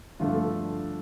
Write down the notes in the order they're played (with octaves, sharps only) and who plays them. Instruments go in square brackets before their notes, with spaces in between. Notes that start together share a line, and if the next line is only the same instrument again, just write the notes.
[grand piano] G2 D3 F3 A3 F4
A4